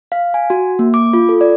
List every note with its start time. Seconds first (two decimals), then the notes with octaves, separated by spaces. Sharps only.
0.12 F5
0.34 G#5
0.50 F#4
0.79 A#3
0.94 D6
1.13 F4
1.29 A4
1.41 D5